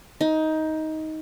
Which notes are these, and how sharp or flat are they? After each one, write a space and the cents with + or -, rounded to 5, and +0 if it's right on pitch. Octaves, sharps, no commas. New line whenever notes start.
D#4 +15